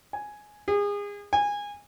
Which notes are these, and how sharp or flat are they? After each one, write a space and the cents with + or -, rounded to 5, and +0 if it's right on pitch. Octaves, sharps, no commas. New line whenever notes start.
G#5 +5
G#4 -30
G#5 -20